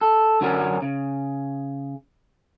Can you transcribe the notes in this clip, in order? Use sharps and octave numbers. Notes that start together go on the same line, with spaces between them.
A4
F#2 D3 F#3 C#4 A#4
C#3